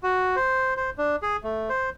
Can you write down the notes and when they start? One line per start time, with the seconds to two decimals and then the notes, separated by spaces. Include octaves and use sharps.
0.03 F#4
0.36 C5
0.77 C5
0.98 D4
1.22 G#4
1.44 A3
1.69 C5